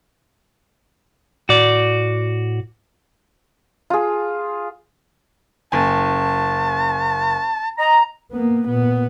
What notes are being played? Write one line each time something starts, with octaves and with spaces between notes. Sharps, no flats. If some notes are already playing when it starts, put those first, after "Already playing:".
A2 F#4 D5
F4 G#4
F#1 G#5 A5
D#5 A#5
A#3 B3
A#2 B3